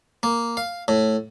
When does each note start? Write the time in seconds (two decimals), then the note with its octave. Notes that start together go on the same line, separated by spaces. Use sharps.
0.23 A#3
0.57 F5
0.88 A2